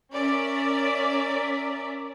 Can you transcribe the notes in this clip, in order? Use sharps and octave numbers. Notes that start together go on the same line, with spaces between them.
C#4 A#4 D5 E5